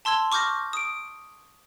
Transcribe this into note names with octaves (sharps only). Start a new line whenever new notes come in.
A5 C6 E6 G#6 G7
C#6 D6 F6 G6 A#6
D#6 D7